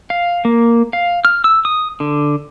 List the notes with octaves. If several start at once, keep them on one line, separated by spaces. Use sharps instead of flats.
F5
A#3
F5
F6
E6
D#6
D3